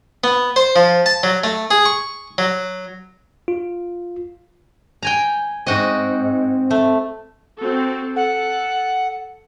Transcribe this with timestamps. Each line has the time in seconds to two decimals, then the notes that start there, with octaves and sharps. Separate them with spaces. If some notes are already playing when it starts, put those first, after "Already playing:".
0.24 B3
0.56 C5
0.76 F3
1.06 A5
1.23 F#3
1.44 A3
1.71 G#4
1.85 C#6
2.38 F#3
3.48 F4
5.03 G5 G#5 A#5
5.66 G#2 C4 F#4 D#5
6.71 A3
7.58 C4 F#4 A4
8.16 A4 F#5